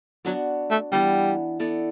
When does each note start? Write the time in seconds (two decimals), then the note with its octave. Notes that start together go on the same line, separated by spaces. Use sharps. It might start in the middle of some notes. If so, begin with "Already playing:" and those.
0.25 F#3 B3 D4 F#4
0.70 A3
0.92 E3 G3 B3 D4
1.60 B3 E4 A4 D5